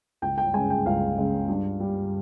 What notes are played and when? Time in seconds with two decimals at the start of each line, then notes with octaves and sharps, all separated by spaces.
0.22 C#2 G5
0.38 G5
0.54 C#3 G#3 G#5
0.70 G5
0.86 C#2 F5
1.17 C#3 G#3
1.48 G2
1.80 G3